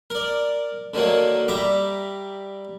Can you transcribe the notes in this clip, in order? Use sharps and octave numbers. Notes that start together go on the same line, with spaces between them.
A#4 D5
D3 D#3 F#3 A#3
G3 E5 A#5 D6